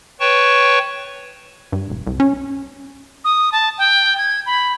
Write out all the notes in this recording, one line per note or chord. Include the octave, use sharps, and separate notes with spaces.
B4 C#5 G5 A5 C#6
G2
E1
C2
C#4
D#6
A5
G5
G#6
B5